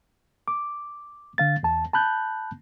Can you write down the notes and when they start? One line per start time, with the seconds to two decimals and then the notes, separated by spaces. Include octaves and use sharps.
0.48 D6
1.38 D3 F5 A6
1.63 E2 A5
1.93 A5 B5 F#6 G6